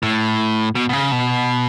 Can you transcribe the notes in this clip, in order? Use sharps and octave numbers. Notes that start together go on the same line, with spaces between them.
A2
B2
B2
C#3
B2